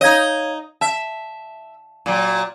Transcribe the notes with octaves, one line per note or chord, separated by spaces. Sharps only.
D#4 C#5 D#5 F5 G#6
E5 A5
A#2 F#3